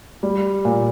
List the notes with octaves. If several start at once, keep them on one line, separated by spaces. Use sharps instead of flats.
G3
A#2